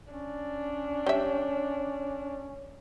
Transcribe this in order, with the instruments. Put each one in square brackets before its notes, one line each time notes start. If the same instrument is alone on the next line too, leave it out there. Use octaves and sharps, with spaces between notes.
[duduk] C#4 [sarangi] D4
[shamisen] G3 E5 [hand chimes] C#5